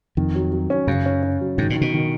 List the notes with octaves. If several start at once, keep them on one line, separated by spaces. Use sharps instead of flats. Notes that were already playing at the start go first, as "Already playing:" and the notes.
F2 D#3
F#3
F#3
C#4
F#2 C#3
C#4
C#4
F#3
G#2 D#3
A#2
D#3
B2
D#3